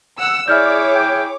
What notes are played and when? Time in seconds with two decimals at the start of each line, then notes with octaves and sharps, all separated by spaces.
0.19 F#5 E6
0.48 E4 G#4 C#5 D5 E5 D6 F6 G6
0.95 G5